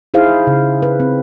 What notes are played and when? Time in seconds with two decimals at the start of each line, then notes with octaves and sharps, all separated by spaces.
0.14 D#4 E4 G#4 C5 F5
0.47 C#3
0.82 B4
1.00 C4